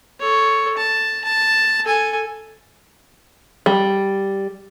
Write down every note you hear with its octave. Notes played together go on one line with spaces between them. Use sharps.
A4 C#5
A5
A5
A4 G#5
G3